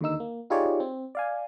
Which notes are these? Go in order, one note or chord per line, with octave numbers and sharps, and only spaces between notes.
D#2 D3 D#3 D#4 E6
A#3
D#4 F4 G4 G#4 C#5 D5
C4
D5 F5 G#5